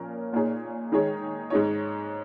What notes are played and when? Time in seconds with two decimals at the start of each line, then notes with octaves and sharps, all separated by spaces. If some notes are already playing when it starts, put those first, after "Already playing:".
Already playing: A#2 F3 C#4 A#4
0.33 A#2 A#3 D#4 G#4 C#5
0.92 D#3 G#3 D#4 G#4 C#5
1.50 G#2 G#3 D#4 C#5